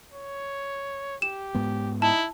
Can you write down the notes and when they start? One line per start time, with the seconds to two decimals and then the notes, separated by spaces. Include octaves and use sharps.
0.13 C#5
1.22 G4 E7
1.55 G#2 G#3 B3
2.02 D#4 E4 A5